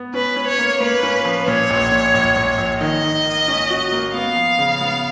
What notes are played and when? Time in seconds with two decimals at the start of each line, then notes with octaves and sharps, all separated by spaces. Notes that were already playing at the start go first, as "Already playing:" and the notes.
Already playing: B3
0.14 C#4 B4
0.36 C#4
0.47 C#5
0.59 A#3
0.80 A#3 B4
1.03 C#4
1.25 F3
1.48 A#2 C#5
1.70 A#1
1.92 A#2
2.14 A#1
2.36 A#1
2.58 A#1
2.81 D#3 D#5
3.03 D#3
3.25 A#3
3.48 C#4
3.70 F#4
3.92 A#3
4.14 B3 F5
4.36 F3
4.59 C#3
4.81 B3